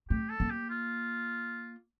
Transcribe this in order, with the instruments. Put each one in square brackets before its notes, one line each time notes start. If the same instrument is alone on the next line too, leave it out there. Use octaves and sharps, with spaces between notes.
[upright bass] A3 [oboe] G4
[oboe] A4
[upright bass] A#3
[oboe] G4
F4